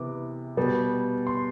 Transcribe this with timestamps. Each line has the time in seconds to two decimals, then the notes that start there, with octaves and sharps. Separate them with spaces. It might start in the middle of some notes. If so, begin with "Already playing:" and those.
Already playing: C3 E3 B3 D6
0.57 B2 G3 B3
1.27 C6